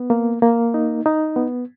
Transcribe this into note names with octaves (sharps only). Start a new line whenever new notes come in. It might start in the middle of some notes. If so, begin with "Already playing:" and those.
Already playing: B3
A#3
A#3
D#4
D#4
B3